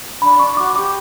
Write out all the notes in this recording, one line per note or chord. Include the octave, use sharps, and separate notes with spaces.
D4 B5
D4 C#6
F#4 D6
G4 D6